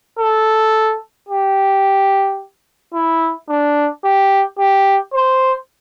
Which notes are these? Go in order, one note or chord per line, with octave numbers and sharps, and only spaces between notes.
A4
G4
E4
D4
G4
G4
C5